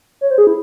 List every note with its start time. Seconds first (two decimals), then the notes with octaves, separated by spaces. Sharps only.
0.21 C#5
0.30 C5
0.38 G#4
0.47 E4